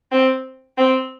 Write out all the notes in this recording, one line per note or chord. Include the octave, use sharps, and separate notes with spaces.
C4
C4